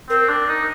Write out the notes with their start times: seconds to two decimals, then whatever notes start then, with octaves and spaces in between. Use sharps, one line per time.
0.09 C4 A#4
0.29 D4
0.48 D#4